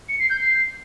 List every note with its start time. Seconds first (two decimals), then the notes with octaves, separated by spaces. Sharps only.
0.09 C#7
0.19 C7
0.30 G6
0.40 C7